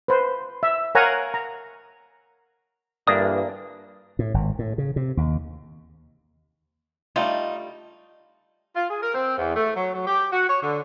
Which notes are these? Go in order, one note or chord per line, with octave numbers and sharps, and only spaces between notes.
B4 C5
E5
A#4 C#5 F5 F#5 G#5 A#5
A#5
G2 A#2 D3 E3 A#3 D4 D#6
A2
G#1
A2
C#3
C3
D#2
G3 A3 D#4 F4
F4
G#4
A#4
C4
E2
A3
F#3
F#3
G4
F#4
C#5
D3